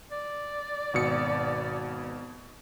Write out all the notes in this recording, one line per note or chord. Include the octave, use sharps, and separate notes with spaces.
D5
G#1 B2 C#7